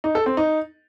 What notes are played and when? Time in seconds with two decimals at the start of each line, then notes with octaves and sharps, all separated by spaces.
0.04 D#4
0.15 A4
0.26 C4
0.37 D#4